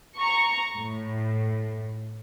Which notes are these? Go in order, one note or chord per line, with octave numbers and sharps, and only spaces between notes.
A#5 C#6
A2